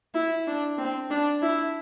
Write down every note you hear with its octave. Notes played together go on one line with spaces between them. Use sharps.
E4
D4
C4
D4
E4